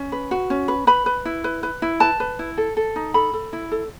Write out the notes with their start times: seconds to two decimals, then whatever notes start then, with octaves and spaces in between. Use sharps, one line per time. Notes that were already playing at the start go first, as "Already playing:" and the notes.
Already playing: C#4
0.12 B4
0.31 F#4
0.50 C#4
0.68 B4
0.87 B4 B5
1.06 B4
1.25 E4
1.44 B4
1.63 B4
1.82 E4
2.00 B4 A5
2.20 B4
2.39 E4
2.58 A4
2.77 A4
2.96 D#4
3.14 A4 B5
3.34 A4
3.53 E4
3.71 A4